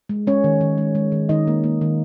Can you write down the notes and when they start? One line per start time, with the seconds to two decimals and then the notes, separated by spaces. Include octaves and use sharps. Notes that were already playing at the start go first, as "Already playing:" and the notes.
0.09 G#3
0.27 G#3 C#4 C#5
0.44 D#3
0.61 D#3
0.78 G#3
0.95 G#3
1.12 D#3
1.29 D#3 D#4 D#5
1.47 A#3
1.64 A#3
1.81 D#3